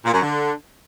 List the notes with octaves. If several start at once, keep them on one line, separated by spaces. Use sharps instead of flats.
A#2
F#2
D3